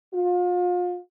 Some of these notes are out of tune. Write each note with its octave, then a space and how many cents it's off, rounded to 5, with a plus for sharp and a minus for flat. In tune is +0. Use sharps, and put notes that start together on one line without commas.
F4 +35